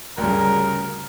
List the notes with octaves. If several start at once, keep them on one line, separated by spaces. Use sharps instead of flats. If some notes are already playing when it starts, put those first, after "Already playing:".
D2 G2 C#3 A#4